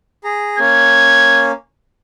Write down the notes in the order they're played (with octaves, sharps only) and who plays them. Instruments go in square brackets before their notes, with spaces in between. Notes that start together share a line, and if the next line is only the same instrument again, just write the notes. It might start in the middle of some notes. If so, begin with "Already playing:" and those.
[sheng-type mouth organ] G#4 A#5
[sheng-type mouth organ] A#3 C#4 [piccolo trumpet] G#6